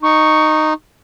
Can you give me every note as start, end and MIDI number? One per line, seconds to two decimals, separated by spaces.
0.03 0.73 63
0.03 0.71 85